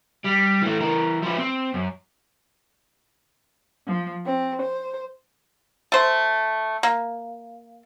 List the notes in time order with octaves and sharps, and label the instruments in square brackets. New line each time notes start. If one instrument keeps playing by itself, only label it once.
[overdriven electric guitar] G3
E3 A3
E3 A#4
F3 B4
C4
F#2
[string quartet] F3
C4
C5
[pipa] A3 C5
A#3